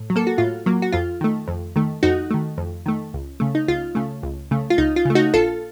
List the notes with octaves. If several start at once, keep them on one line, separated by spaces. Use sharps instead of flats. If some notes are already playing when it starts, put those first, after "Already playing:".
Already playing: A2
F#3
A#3 A4
F#4
A2 F4
F#3 A#3
F#4
F2 F4
D#3 A3
F2
D#3 A3
F2 D#4 F#4
D#3 A3
F2
D#3 A3
C#2
C#3 A3
D#4
C#2 F4
C#3 A3
C#2
C#3 A3
F4
C#2 D#4
F4
C#3 A3
D#4 F#4
A#1 F4 A4